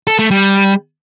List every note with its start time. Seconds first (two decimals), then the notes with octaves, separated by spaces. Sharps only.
0.07 A4
0.19 A3
0.31 G3